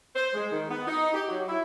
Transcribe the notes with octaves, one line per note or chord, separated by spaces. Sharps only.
C5
G#3
D#3
B3
D#4
G4
F#3
E4